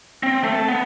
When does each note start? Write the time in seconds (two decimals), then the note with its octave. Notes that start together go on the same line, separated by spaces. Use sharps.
0.23 C4
0.44 A3
0.55 A5
0.68 B3